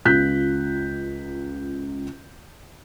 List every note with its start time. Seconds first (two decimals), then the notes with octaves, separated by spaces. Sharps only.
0.05 C#2 F4 F#6 G6 B6